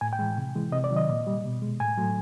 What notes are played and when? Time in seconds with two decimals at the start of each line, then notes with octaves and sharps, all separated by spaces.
0.01 A2 G#5
0.13 G5
0.19 E3 G#3
0.37 C3
0.55 E3 G#3
0.72 C3 D#5
0.84 D5
0.91 D#3 F#3
0.97 D#5
1.09 A#2
1.27 G3
1.45 B2
1.62 G#3
1.80 A2 G#5
1.97 F#3 A3